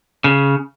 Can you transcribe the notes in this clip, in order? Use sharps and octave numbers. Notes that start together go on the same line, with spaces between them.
C#3